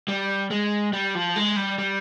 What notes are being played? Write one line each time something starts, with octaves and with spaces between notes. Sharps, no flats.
G3
G#3
G3
F3
G#3
G3
G3